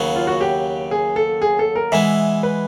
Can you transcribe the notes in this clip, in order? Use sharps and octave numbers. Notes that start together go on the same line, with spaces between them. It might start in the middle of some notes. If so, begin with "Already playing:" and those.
Already playing: D#2 C#3 F#3 B3
F4
F#4
G4
G#4
A4
G#4
A4
A#4
E3 G#3 B3 E5
B4